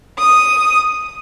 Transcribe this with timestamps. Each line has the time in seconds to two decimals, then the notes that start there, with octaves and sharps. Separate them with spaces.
0.18 D#6